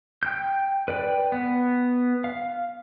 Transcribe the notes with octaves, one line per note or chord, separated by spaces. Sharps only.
G5 G6
B4 D5 G5
B3
F5